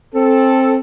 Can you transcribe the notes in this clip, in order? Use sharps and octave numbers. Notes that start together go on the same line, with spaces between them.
C4 A4